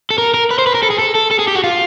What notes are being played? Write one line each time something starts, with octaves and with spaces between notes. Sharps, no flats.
A4
A#4
A#4
B4
C5
B4
A#4
A4
G#4
A4
A4
A4
G#4
G4
F#4
F4